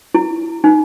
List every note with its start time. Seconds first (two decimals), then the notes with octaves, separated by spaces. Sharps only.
0.15 E4
0.64 D#4